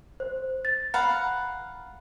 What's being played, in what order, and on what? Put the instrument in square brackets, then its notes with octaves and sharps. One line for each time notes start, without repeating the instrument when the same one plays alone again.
[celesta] C5
A6
[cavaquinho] F5 F#5 [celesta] A#5 B5